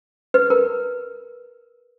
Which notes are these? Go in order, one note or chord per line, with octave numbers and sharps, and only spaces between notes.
B4
A#4